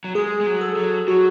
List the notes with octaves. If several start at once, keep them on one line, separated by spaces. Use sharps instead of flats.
F#3
G#3 G#4
G#3
F#3
A4
F#3
F#3 F#4